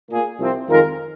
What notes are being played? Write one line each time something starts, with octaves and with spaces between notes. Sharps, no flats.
A#2 A#3 G#4
C2 C3 F3 C4
F2 D#3 G#3 F4 A#4